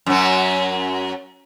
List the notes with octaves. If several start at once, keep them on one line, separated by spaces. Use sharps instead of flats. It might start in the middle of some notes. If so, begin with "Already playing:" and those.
F#2 F#3